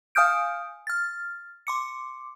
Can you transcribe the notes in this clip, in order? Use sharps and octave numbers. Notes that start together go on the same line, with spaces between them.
F5 G#5 D#6 F6 G6 D7
F6 A6
C6 D6 C#7